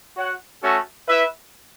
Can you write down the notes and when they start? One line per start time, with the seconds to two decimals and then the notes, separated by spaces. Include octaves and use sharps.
0.16 F#4 C#5 F#5
0.61 A3 C#4 F#4 A4 E5
1.07 E4 B4 E5